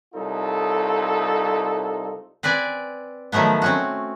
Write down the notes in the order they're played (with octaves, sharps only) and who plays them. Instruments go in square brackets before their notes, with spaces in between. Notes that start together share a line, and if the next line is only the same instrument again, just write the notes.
[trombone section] C2 D#4 F4 A4
[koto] C4 B4 D5 G#5
D#3 F3 F#3 A3 B3
C4 C#4 F#4